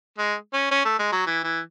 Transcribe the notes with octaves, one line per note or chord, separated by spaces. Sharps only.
G#3
C#4
C#4
A3
G#3
F#3
E3
E3